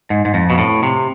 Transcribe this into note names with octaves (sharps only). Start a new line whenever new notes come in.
G#2
G#2
F2
B2
A2
C3